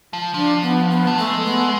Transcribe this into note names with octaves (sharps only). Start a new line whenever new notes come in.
F3
F3 D4
B3
B3
A3
G#3 A3
B3